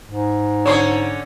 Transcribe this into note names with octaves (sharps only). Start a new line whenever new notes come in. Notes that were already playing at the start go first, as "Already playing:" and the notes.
G#2
D3 C#4 C#5 C6 C#6